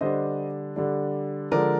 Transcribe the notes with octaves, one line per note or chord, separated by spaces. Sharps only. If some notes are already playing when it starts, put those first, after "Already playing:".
D3 G3 D4 C5 D#5
D3 G3 D4
D3 F3 G#3 A#4 D5